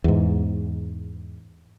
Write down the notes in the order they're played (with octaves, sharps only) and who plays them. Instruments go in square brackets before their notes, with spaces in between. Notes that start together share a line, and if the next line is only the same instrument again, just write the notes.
[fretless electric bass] E2 G#2